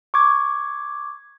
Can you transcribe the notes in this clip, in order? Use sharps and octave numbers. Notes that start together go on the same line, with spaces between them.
C#6 D6 G#6